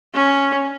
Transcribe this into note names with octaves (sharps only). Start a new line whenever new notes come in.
C#4